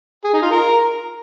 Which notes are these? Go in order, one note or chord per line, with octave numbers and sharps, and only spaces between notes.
G#4
D#4
F4
A#4